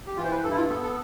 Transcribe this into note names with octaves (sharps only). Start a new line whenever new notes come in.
G4
E3 F4
C5
B4
G2 A4
E4
F4
B3 A4
A4